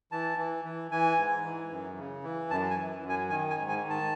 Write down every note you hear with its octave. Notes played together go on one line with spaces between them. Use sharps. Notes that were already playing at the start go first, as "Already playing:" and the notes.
E3 A5
E3
E3
E3 G#5
G#2
E3
F#2
C#3
E3
F#2 A5
G#5
E3
F#2
G#5
D#3 G#5
G#5
G#2
G#5
D#3
A5